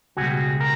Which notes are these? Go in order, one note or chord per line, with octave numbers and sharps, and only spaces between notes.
C#2 B2 G3 F#4 G#4
A#4